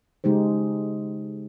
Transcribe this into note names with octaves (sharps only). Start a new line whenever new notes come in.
C#3 G#3 D#4 G4 C5